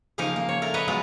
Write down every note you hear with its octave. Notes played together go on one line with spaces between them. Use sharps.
C#3 F3 A#3 D#4 A#4
A#3
C#5
A3 A#4
B4 C#5 D#5 A#5
F#3 G#3 B3 F4